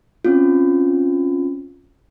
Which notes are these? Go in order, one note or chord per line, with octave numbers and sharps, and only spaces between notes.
C4 C#4 F4